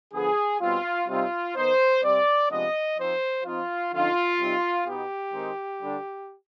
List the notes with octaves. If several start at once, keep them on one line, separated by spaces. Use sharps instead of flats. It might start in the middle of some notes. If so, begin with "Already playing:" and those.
D3 F3 B3 G#4
B2 G3 C4 F4
C3 G3 C4 D#4 F4
D#3 B3 D#4 C5
C3 G3 C4 D5
C3 F3 G#3 B3 D4 D#5
F3 C4 D#4 C5
F3 C4 D#4 F4
D3 F3 C4 D#4 F4
C3 G3 C4 D#4
B2 B3 D#4 G4
D#3 G#3 C4 D#4
D3 G3 D4